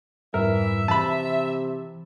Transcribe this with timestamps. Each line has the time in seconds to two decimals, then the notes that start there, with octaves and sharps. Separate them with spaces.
0.34 F2 G#2 E3 G3 A#4 E5
0.88 C3 E3 A5 B5